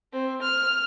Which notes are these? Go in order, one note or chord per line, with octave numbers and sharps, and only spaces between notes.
C4
F6